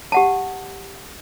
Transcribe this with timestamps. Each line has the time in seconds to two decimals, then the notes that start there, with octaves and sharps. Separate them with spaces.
0.12 G4 F#5 A5